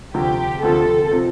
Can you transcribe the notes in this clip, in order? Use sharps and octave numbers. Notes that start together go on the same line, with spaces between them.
D2 C3 F3 C4 G4
D2 C3 F3 C4 A4
C3 F3 C4